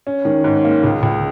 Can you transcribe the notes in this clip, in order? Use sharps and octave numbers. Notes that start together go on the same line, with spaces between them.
C#4
D#3
G#2
A#3
C#2
C#2